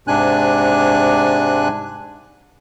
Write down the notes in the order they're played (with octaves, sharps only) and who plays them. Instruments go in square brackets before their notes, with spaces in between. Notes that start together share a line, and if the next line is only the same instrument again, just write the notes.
[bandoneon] G#2 C3 D4 G#5 F#6